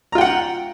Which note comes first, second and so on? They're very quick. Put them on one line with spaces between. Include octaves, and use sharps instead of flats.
A#5 F4 G5 F#5